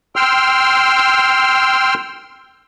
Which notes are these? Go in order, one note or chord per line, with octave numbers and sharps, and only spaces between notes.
G5 C6 E6 F6